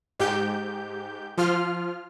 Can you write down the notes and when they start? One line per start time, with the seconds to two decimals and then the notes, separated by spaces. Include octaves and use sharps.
0.19 G#2 G4 G6
1.38 F3 F4 F6